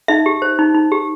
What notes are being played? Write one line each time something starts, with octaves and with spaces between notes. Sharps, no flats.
D#4 E5
G4
C5
D#4
D#4
G4